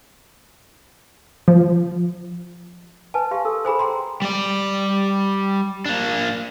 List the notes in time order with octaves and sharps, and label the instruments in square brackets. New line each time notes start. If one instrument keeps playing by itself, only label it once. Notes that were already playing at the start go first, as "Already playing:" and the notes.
[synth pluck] F3
[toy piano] B4 G#5 [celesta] A5
[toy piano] G4 F5 C6
[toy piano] A4 [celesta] E6
[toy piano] G#4 A4 [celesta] C5 G#5 B5
[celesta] G5 A#5 C6
[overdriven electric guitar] G3 D5
A#3 D4